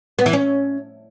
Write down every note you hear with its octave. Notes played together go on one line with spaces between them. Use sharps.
B3
E3
C#4